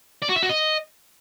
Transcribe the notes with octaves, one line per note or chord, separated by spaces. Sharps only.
D5
F#4
E5
F#4
D#5